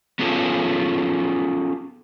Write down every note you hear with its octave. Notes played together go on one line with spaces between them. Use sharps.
B3 C#4 F4 G#4 A4